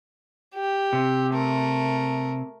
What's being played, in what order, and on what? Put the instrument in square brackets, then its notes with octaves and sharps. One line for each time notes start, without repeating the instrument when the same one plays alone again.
[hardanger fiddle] G4
[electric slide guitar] C3
[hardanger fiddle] A3 A#4